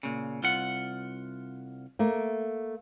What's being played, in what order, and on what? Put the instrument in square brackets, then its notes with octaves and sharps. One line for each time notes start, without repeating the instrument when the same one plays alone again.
[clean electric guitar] A#2 C#3
C2 F4 F#5
[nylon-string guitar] A3 A#3